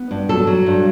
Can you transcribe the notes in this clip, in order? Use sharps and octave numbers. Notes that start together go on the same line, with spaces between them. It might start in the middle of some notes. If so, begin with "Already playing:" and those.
Already playing: B3
G2
F#3 A4
F#3
G2